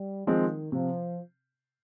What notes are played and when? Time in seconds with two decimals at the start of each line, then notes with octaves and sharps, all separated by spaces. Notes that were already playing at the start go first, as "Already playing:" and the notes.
Already playing: G3
0.27 D#3 F3 G#3 C4
0.72 C3 F3